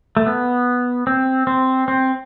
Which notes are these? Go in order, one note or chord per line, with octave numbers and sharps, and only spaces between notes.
A3
B3
C4
C4
C4